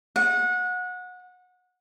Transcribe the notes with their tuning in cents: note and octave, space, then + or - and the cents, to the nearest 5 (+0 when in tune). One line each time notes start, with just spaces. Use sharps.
F#5 -25